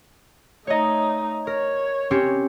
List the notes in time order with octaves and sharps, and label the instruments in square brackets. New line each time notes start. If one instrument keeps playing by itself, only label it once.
[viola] A3 D#4 [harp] C#5 D#5
[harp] A#4 [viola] C#5
[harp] C4 C#4 G4